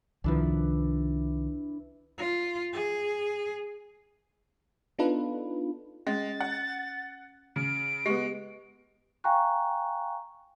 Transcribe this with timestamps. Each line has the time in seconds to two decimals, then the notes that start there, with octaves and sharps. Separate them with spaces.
0.24 C2 D#3 F3 D4 E4 B4
2.18 F4
2.73 G#4
4.99 B3 D4 D#4 F4 A4 B4
6.07 G#3 C#4 A6
6.40 F#5
7.56 C#3 D7
8.06 G#3 B3 G4
9.24 F5 G5 G#5 A#5 C#6 F#6